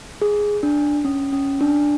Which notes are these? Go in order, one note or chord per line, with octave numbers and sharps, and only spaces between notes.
G#4
D4
C#4
C#4
D4